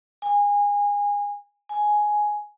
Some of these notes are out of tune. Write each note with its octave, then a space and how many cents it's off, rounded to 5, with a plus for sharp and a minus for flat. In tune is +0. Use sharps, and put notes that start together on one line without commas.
G#5 -25
G#5 +5